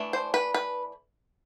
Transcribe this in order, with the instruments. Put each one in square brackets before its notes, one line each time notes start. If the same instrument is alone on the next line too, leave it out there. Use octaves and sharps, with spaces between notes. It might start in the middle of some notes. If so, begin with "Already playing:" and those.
Already playing: [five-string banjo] E3 A3 D4
C5
B4
B4